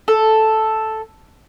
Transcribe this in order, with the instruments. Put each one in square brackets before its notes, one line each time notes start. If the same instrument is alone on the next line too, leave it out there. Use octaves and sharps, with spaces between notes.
[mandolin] A4